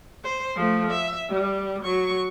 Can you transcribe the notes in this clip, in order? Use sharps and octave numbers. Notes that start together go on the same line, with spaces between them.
C5
F3 A3
E5
G3
F#3 C#6